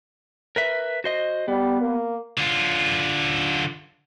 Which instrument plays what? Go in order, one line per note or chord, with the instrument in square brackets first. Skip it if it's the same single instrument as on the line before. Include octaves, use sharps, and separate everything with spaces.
[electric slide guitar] A#4 B4 E5
F#4 C5 D#5
[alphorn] G3 [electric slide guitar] B3
[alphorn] A#3
[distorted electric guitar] D3 F4